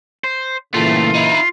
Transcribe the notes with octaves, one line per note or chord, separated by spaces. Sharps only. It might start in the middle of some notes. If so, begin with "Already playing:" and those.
C5
G2 A#2 C#3 E3 A3 F4
D#4 E4